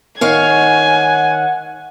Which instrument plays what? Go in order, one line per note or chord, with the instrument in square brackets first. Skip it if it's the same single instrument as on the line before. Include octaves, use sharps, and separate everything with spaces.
[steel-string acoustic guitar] D#3 C#5 F5 [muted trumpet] F#5 [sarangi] G#5